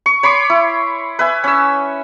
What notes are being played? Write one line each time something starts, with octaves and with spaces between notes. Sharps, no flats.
C#6
C#5 B5 C6 D6
E4
B4 E5 G#5
C#4 E6